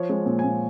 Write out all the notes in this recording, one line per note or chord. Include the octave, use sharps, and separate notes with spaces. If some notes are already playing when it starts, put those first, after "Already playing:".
Already playing: F3 C#5
G#3
A#2
G#5
A#2